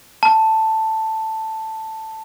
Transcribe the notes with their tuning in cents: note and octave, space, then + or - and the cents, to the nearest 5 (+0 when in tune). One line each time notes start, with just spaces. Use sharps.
A5 +5